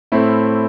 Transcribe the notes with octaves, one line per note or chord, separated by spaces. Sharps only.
A2 A3 C4 E4